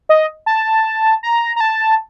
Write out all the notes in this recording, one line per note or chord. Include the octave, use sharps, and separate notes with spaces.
D#5
A5
A#5
A#5
A5